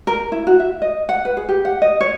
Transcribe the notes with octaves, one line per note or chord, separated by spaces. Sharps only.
A#4
E4
F#4
E5
D#5
F#5
B4
G#4
G4
F#5
D#5
C#5